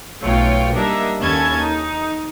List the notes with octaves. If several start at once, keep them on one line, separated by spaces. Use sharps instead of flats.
B1 A3 F4 C#5 F5 G5
G3 A#3 D4 D#4 A#4 E5
D#2 C#4 E4 A4 A5 G#6
D#4